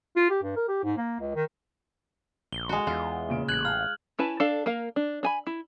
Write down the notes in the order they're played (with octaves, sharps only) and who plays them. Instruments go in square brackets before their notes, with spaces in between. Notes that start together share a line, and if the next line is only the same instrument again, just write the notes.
[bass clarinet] F4
G4
G2
A#4
G4
G#2
A#3
C#2
D#3
[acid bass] A#1 [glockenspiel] G7
[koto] G#3 F#4
[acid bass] E2 [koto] F4
[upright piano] A#2 C#3 D7
[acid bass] A1 [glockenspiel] F#6 G#6 F#7
[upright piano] F5 [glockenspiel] F6
[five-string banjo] C#4 E4 B4 A5
D4 A4 F5 A5
A#3 A#4 F5
D4
D4 G#5 B5
E4